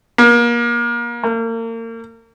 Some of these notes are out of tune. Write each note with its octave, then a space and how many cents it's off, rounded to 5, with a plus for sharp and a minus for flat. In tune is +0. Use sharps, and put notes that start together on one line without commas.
A#3 +30
A#3 -35